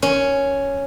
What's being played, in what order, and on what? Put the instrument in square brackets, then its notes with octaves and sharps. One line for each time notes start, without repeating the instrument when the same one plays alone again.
[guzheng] C#4